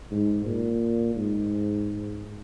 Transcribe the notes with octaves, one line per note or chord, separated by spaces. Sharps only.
G#2
A#2
G#2